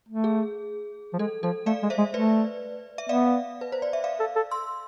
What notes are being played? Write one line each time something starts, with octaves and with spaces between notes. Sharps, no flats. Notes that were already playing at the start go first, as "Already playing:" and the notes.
A3
G#4
F3
G#3 A4
F3 A4
A3 D5 F5
G#3
C5 E5
G#3
A3 B4 D5
E5
B3 D5 F5
B4
C5
D5
E5
D5 F5
A4
A4
C6 E6